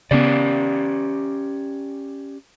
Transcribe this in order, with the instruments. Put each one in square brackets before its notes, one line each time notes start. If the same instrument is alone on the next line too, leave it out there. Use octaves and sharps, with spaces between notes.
[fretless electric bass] C#3 B3 [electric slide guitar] C#4 G4 D5